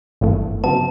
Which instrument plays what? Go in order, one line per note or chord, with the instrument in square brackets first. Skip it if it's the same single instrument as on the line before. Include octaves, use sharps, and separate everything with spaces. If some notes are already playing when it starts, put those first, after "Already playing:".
[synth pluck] G1 G2 E3 A3
[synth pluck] C#3 F#3 B3 [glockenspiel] A5